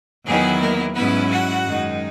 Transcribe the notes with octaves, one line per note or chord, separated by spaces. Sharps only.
E2 D#3 F#3 B3 E4 G#4
A#3 A#4
G#2 F#3 B3 C#4 E4 B4
F#4 F#5
F#2 D#3 G#3 D#4